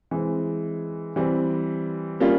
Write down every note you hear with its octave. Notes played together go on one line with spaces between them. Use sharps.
E3 G#3 C4
E3 G3 C4
G3 A#3 C#4 F4